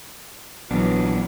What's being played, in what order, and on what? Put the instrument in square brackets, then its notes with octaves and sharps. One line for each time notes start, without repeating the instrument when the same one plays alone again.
[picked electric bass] A#1 E3 [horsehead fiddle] F#3 [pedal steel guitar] B3 D4